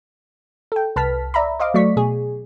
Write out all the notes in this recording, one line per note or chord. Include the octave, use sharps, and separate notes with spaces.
A4 G5
C2 B4 A5 F6 B6
D5 E5 A#5 B5
C5 D#5 F5 D6
F#3 A3 D5 C#6 B6
B2 G#4